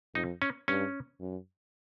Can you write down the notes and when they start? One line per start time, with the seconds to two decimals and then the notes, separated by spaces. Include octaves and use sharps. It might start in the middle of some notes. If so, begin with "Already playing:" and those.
0.15 F2 D#4
0.42 C#4
0.68 G2 C#4
1.21 F#2